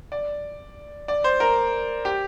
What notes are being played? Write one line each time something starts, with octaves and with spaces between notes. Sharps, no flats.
D5
D5
C5
A#4
G4